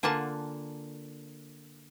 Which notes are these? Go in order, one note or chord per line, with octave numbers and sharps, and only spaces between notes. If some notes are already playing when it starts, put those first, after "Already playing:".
D3 A#3 F4 F#5 G#5 A5